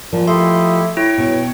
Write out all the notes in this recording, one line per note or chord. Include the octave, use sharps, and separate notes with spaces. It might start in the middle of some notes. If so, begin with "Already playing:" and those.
A#2 F3
A3 E4 G4 D#5 C6
E4 C#5 G5
B2 F#3